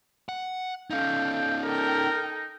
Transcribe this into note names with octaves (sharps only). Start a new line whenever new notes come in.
F#5
C#4 D#4 A4 F5 G5
G5
G4 A4 A#4 G5
D#4